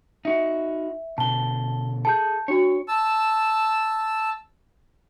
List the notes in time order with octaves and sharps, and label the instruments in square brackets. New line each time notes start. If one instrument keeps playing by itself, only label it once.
[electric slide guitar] D#4 F#4 [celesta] E5
[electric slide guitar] B2 D3 [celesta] A5 G7
[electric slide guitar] G#4 A4 [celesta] A5 G6
[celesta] D4 F#4 [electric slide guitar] C#5
[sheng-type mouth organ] A5 E6